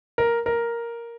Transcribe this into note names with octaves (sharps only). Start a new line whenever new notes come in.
A#4
A#4